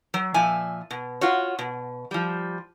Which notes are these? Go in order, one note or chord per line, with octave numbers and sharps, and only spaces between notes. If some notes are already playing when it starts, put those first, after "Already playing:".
F#3
A#2 F3 E5 G#5
B2
F4 F#4 C#5
B2
F3 G3